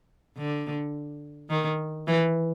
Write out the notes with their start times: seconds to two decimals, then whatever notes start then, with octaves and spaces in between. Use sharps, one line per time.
0.37 D3
1.50 D#3
2.08 E3